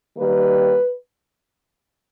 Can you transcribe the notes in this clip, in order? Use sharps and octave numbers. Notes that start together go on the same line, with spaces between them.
D#3 G3 A#3 B4